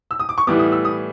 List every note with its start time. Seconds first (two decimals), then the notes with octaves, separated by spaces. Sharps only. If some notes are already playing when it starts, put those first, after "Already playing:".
0.11 E6
0.20 D#6
0.29 D6
0.38 C#6
0.47 A2 E3 G3 B3 D6
0.59 D#6
0.72 E6
0.85 D#6